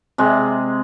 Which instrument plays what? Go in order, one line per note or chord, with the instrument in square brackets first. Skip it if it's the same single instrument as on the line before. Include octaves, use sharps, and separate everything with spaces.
[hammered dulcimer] C3 G#3